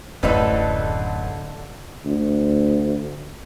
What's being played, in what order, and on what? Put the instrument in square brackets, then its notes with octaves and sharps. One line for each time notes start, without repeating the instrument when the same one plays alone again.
[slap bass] D1 F#2 [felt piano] A1 B4 [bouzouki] D3 D#4 A4
[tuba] D2